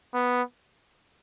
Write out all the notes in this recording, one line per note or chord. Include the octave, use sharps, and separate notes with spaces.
B3